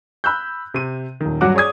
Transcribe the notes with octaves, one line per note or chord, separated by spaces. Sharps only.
B5 E6 F#6 G6
C3 D#7
D#1 D#3
G2 F#3 F#4 F#5 D6
G#4 C#5 D5 D#6 G#6